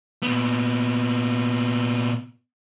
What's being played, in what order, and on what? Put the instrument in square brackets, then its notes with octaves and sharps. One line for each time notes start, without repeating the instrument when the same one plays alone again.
[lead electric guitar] A#2 B3